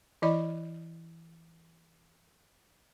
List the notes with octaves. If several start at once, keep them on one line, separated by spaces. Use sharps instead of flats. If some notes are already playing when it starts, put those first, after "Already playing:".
E3 E4 D5 D#5 B5